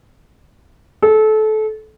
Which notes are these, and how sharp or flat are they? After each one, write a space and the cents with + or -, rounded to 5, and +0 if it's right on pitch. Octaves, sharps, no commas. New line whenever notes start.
A4 -25